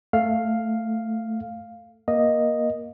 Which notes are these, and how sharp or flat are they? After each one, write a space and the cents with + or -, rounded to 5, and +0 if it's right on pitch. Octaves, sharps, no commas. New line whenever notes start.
A3 +10 F5 +0
A#3 +15 D#5 +0